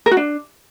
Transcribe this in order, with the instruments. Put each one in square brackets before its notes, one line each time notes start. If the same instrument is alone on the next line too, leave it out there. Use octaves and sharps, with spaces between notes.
[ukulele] A#4
F#4
D4